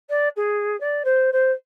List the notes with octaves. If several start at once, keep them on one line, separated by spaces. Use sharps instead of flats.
D5
G#4
D5
C5
C5